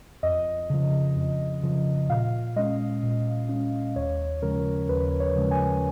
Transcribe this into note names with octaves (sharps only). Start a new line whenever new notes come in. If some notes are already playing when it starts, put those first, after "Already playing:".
F2 D#5
C#3 F3
F2
C#3 F3
A#2 F5
G#3 C#4 D#5
A#2
G#3 C#4
D#2 C#5
C#3 F3 G#3 C#4 A#4
D#2 B4
C#5
C#3 F3 G#3 C#4
G#5